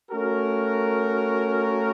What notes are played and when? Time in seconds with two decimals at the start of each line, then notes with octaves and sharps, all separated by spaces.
0.11 A3 C#4 F#4 A#4